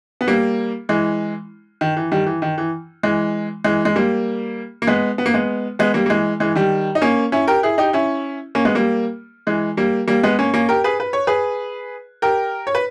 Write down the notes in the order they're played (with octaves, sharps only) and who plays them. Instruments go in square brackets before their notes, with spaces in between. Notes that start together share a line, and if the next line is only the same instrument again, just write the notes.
[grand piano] B3
G3 A#3
E3 G#3
D#3
E3
D#3 G3
E3
D#3
E3
E3 G#3
E3 G#3
G#3
G3 A#3
A#3
G#3 B3
B3
A#3
G#3 B3
G#3 B3
G3 A#3
A#3
E3 G#3
E3 G#3
D#3 G3
D#4
A#3 C#4
C#4 E4
G4 A#4
E4 G#4
D#4 G4
C#4 E4
A#3 C#4
G#3 B3
G3 A#3
E3 G#3
G3 A#3
G3 A#3
G#3 B3
A#3 C#4
A#3 C#4
G4 A#4
G#4 B4
B4
C#5
G#4 B4
G4 A#4
C#5
B4